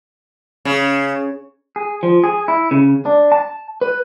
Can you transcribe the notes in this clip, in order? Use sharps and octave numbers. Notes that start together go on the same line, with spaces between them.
C#3
G#4
F3
G#4
E4
C#3
D4
A5
B4